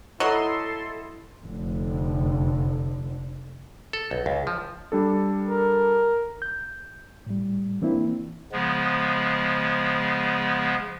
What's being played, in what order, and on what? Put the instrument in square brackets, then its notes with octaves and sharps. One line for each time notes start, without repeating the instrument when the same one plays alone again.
[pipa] F#3 [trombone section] E4 [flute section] A4 [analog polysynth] D#5 C6
[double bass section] F1 D3
[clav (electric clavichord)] A4
B1
C#2
F3
[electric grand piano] G3 D4 A4
[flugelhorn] A#4
[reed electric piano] G6
A2 G3
E3 A#3 C4 D4 E4
[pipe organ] C#3 F3 G#3 B3